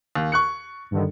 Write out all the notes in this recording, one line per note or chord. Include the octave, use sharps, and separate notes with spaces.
D#2
C#6 F#6 C#7
G2 D3 D#3